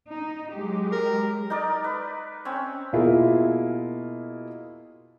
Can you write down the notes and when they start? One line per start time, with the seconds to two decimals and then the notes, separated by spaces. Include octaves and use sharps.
0.10 D#4
0.53 F#3 G#3 G4
0.92 A#4
1.50 D#4 A#4 D5
1.84 B4
2.45 C4 C#4
2.93 B2 A#3 E4 F4 G#4